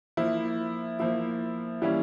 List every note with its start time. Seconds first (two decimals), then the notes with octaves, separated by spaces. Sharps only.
0.17 F3 A#3 E4
0.99 F3 A#3 E4
1.82 E3 G3 A#3 C#4 E4